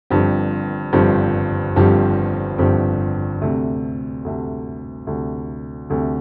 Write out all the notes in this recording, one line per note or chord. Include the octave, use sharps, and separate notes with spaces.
G1 G2 F3 C4 G4
G1 G2 F3 C4 G4
G1 G2 F3 C4 G4
G1 G2 F3 C4 G4
D2 C3 A3
D2 C3 A3
D2 C3 A3
D2 C3 A3